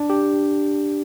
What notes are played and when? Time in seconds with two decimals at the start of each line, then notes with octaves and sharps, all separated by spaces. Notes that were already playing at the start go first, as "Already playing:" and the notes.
Already playing: D4
0.10 G4